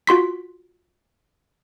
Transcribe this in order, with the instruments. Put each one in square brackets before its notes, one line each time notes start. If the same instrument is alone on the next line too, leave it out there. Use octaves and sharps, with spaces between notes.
[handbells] F4 F#4 C6 B6